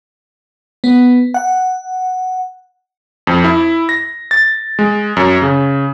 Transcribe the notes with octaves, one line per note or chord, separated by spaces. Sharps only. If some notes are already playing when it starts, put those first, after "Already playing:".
B3
F#5
F2
E4
A#6
A6
G#3
F#2
C#3